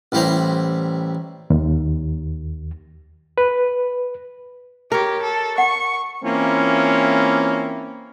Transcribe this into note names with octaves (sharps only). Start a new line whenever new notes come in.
A1 G3 E4 C5 A#5
D#2
B4
G4 A#4 C#5
A4
F#5 C#6
E3 A#3 C4 C#4 E4 F4